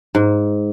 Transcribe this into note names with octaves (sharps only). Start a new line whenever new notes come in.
G#2